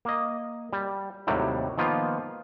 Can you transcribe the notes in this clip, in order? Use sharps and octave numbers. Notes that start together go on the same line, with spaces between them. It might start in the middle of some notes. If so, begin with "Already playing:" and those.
A#3 D#5
G3
D#2 A2 C3 F#3 G3
D#3 F3 A#3 B3 F4